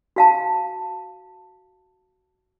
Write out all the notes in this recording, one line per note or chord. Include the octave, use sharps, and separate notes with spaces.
F#4 F5 A5